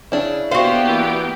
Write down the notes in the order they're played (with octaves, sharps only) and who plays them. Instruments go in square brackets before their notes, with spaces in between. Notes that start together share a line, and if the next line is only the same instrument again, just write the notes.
[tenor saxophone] C#3 [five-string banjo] D4 E4
[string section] A#3 B3 G4 [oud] F#4 F5 [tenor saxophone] C5
[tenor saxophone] E3